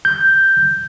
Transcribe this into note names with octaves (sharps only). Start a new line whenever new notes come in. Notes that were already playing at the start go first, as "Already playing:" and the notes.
G6